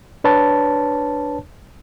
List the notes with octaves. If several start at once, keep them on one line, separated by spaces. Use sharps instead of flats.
D4 B4 C#5 A5